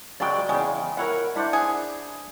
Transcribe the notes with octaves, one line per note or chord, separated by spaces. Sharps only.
C#3 F#3 G#3 D5 G5
E2 C#3 G#3
E4 A#4 C#5 F#5
D4 E4 C5 F#5
G#4